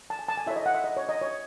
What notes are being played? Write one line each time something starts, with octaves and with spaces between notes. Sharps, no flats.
A5
G#5
A5
G#5
E4 A4 C#5 E5
D#5
F#5
E5
D#5
C#5
D#5
C#5